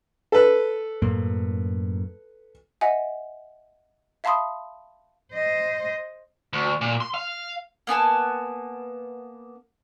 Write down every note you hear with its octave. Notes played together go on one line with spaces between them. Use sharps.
A4 B4
F#2 A2 A#3
D#5 E5 F#5 G#5
E5 F5 A5 B5 C6 D#6
C5 D#5
D2
A#2
C6
F5
A#3 B3 G#5 A5